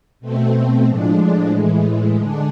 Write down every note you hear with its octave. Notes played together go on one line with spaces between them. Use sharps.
B2 A3 C4
A2 F3 G#3 D4
A2 E3 G#3
D3 G#3 D4